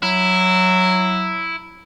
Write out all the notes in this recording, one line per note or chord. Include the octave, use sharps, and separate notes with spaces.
F#3 E4